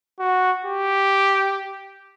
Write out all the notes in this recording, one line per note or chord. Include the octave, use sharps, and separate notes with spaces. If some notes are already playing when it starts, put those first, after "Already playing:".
F#4
G4